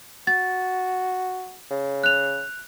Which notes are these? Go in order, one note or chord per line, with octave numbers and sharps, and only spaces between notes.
F#4 A6
C#3
F#6 F7